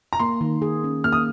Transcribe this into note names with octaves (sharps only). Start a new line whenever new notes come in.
A#5
A#3 C6
D#3
G#4
C#4
A#3 F6
D#6